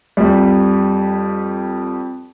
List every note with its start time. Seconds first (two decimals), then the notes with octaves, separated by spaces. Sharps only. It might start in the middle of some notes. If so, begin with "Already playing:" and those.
0.17 F2 G3